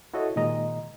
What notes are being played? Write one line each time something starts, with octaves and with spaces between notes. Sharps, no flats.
E4 F#4 A4 C#5 D#5
A#2 D#3 G#3 D#5 A#5